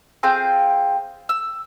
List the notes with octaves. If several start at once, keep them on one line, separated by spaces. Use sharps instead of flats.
C4 F4 G#4 G6
E6